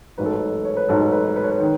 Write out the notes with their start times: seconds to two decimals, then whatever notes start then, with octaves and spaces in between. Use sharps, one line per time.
0.18 A1 G#2 F#3 B4
0.25 A4
0.33 B4
0.65 C#5
0.77 B4
0.89 A1 G#2 F#3 A4
1.12 B4
1.36 B4
1.44 C#5
1.51 B4
1.60 D#3